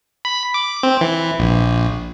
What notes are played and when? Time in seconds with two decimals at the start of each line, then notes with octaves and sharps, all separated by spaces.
0.25 B5
0.54 D6
0.83 C4
1.01 E3
1.39 A#1